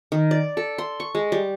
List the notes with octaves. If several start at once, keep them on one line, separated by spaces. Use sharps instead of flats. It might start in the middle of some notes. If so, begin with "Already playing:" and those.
D#3
D5
A4
C6
C#6
G#3
G3